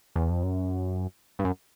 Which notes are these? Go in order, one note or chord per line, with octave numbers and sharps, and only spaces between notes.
E2
F2
F#2
G2
F#2